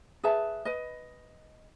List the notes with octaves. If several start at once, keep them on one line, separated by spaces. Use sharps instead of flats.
G#4 B4 E5 A5
B4 D#5